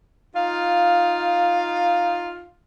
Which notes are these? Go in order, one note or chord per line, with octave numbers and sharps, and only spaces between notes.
D#4 F4 F5